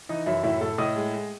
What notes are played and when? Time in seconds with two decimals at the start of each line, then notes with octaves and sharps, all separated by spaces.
0.09 E3 D#4 D#5
0.26 F#2 E4 E5
0.43 A2 E4 E5
0.61 A2 A4 A5
0.78 A2 D#5 D#6
0.96 G#3
1.14 G#3